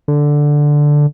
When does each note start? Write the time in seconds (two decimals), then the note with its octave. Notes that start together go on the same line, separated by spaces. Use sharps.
0.08 D3